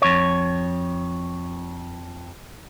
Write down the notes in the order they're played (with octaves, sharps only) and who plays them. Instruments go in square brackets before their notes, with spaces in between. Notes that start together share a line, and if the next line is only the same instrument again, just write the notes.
[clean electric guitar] F2 C#5